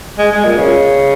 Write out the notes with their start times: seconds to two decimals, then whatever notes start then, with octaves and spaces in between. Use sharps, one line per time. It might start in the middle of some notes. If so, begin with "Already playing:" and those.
0.18 G#3
0.31 G#3
0.45 A#2
0.58 C#3